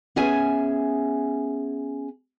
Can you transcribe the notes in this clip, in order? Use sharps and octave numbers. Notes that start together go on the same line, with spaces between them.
B3 C#4 G#4 E5 G#5